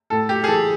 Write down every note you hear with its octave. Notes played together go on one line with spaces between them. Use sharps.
A2 A4
G4
G#4
E3 A4